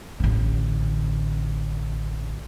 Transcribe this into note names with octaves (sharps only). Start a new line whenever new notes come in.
A1 D3